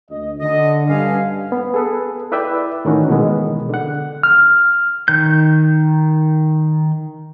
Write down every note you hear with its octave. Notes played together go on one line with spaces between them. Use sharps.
D2 D#5
D3 D#5
G2 C#4 F5
B3
G#4 A4 B4
E4 B4 D5 E5 G5
A2 D#3 E3 C#4 F#4
B2 D#3 E3 G#3 B3
D3 F#5
F6
D#3 G6